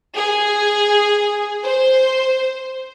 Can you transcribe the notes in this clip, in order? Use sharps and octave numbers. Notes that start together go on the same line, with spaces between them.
G#4
C5